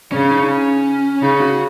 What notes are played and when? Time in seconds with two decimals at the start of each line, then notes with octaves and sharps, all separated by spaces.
0.12 C#3 C#4
0.31 D#4
0.43 D#4
0.48 C#4
1.22 C#3 D#4
1.41 F#4